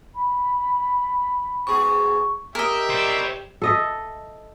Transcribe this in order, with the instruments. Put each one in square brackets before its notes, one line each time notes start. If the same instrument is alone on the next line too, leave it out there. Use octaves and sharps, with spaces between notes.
[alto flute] B5
[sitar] G#2 B2 G#4 [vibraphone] C#6
[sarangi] G4 [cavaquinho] A#4 D#5 [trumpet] E5
[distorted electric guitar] C5 D5
[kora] A4 D#5 E5